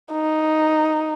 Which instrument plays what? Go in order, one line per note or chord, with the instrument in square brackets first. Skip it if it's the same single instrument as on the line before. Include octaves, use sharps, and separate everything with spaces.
[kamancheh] D#4